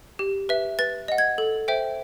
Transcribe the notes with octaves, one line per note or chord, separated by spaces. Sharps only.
G4
B4 E5
B4 A6
D#5 F#5
G#6
A4
C5 E5 G5